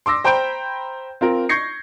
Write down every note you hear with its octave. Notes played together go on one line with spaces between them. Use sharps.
C6 D6 E6 A#6
C5 G5 A#5 B5 G6 D7
C4 F4 A#4
C#6 G6 G#6 A#6 C7 C#7